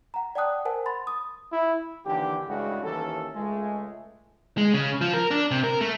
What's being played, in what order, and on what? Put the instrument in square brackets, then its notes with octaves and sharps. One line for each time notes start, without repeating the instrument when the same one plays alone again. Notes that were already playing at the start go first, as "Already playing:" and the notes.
[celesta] F#5 A#5
D5 F#5 G5 A5 D#6 F#6
A#4 C5 F#5 G#5 A5
B5 C6 A6
D#6
[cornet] E4
[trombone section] D#2 D3 E3 G4
G2 C#3 G#3 A3 E4 F#4
D#2 E3 C#4 A4
C#2 G#3 A3
[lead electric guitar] G#3
C#3
F3
A#4
D4
C3
A#4
A3